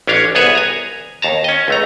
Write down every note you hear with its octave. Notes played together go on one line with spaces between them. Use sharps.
A1 C#4 D4 C#5 F5
C2 B3 G#4 B4 C#5 E5
G#5 A#5
D#2 A5 A#5
C#4 D#5
C#2 A3 A#5